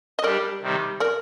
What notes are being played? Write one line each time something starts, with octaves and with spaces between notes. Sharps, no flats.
D#5
G3 D4 G4 A#4 D5
C3 D#3 G3
A#4 D5